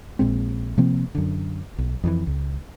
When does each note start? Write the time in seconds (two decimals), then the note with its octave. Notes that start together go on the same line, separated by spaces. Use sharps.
0.19 A#1 A#2 G#3 C4
0.78 C3 F3 A#3 C4
1.15 F#2 D3
1.78 B1
2.04 F2 D#3 E3
2.27 C#2